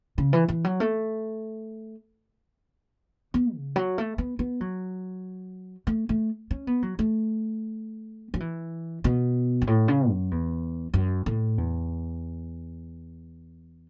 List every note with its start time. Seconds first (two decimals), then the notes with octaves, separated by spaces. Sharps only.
0.18 C#3
0.33 E3
0.48 E3
0.64 F#3
0.80 A3
3.34 B3
3.55 C#3
3.76 F#3
3.98 A3
4.18 B3
4.39 B3
4.61 F#3
5.87 A3
6.09 A3
6.51 C#4
6.67 B3
6.83 F#3
6.99 A3
8.34 F#3
8.40 E3
9.04 B2
9.62 F#2
9.67 A2
9.88 C#3
10.10 F#2
10.31 E2
10.94 F#2
11.26 A2
11.58 E2